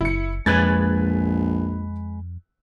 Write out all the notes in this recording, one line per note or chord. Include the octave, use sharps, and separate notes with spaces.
F#1 E4 C#7
A#1 F2 G#3 B4 G#5 F#6 G#6 A6